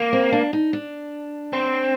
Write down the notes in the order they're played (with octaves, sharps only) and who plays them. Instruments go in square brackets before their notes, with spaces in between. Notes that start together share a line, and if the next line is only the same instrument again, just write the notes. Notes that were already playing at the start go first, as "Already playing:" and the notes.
Already playing: [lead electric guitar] A#3
[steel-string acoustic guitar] C4
D4
D#4
D4
[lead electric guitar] C4